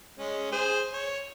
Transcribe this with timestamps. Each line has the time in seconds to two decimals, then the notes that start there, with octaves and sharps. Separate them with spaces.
0.18 G#3 C#4
0.52 G#4 C5
0.93 C#5